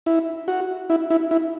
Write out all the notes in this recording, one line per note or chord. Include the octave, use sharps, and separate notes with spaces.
E4
F#4
E4
E4
E4